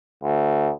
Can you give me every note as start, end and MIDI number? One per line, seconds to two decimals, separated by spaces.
0.24 0.71 38